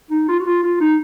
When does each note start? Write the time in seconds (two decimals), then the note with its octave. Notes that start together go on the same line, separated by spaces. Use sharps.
0.10 D#4
0.28 F4
0.39 F#4
0.46 F4
0.63 F4
0.80 D#4